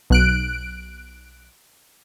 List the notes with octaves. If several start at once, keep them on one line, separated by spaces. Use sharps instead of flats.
B1 F#6 D7